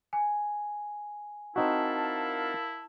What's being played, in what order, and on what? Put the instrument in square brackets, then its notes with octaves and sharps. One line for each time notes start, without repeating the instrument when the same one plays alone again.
[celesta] G#5
[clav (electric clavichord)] C4 D#4 F#4 [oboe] E4 [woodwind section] A#4 F5 A5